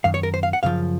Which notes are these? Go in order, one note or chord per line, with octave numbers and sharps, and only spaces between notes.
F#2 D#3 F5
C#5
A#4
C5
F5
F#5
F#2 C#3 F3 F5